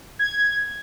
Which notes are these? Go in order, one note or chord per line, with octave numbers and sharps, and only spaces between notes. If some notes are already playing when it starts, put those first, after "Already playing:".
G#6